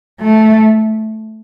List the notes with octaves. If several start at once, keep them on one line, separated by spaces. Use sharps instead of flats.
A3